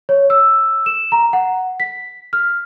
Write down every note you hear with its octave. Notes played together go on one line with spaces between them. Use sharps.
C#5
E6
E7
A#5
F#5
B6
F6